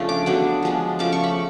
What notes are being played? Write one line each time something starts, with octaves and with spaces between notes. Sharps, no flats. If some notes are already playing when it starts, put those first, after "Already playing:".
Already playing: C#3 F3 A3 D4
D6
D3 F#3 B3 D4
F3 G#3 B3 D4
C#3 F3 A3 C#4 D6
C#6
B5